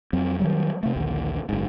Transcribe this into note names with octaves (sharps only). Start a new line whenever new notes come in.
F2 F#3 C4
D#3 F#3 G3
C3 A3
A#1 D#2 D3
F#1 G#2